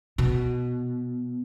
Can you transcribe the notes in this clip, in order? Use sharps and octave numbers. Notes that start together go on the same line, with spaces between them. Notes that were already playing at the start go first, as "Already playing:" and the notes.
B2